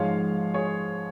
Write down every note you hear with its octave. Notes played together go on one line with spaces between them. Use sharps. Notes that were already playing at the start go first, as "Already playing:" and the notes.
Already playing: G#2 F3 G#3 C#5 F5
G#4 C#5